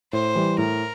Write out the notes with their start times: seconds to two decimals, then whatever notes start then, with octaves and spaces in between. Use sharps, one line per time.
0.13 A2 C5
0.36 E3 G3
0.58 A2 A#4